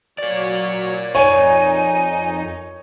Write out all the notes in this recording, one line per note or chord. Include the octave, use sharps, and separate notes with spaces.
F#3 A#4 C#5 D5
F2 D#4 C#5 G#5